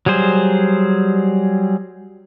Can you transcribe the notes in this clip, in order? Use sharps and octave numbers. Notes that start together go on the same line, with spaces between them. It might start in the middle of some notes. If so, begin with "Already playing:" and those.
F#3 G3 G#4 C5